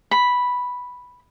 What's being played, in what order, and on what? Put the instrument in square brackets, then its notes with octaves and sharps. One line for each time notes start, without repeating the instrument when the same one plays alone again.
[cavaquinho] B5